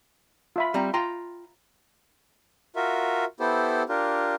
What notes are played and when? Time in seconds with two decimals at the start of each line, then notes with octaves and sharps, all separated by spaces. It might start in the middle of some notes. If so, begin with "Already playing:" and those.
0.56 F4 E5 B5
0.74 G3 C4 A#5
0.94 F4 G5 A#5 C6
2.76 F4 F#4 A#4 E5
3.40 B3 E4 G4 A4 C5
3.89 D4 F4 G4 A#4